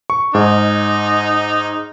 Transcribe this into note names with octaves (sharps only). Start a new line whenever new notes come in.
C#6
G#2 D#4